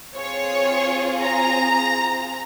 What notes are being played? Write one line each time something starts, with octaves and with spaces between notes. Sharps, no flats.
C4 F4 G#4 C#5
A#5